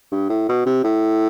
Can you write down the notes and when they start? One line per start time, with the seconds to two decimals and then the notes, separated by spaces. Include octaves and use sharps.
0.12 G2
0.30 A2
0.49 B2
0.66 C3
0.84 A2